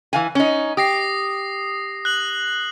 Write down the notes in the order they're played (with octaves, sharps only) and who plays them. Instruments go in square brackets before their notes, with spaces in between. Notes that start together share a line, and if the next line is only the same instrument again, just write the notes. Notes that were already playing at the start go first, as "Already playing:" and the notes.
[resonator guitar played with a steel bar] E3 F5 G#5
C#4 D#4
[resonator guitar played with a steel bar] G4 [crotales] D#6 A#6 C7
[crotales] F#6 F#7